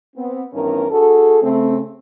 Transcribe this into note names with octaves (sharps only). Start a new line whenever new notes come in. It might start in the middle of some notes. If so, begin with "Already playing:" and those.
B3 C4
G2 D#3 E3 B3 C#4 A#4
D4 F#4 G#4 A4
C#3 A3 C4